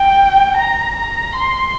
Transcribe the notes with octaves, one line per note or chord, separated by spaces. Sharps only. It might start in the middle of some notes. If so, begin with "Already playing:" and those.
Already playing: G5
A#5
A#5
C6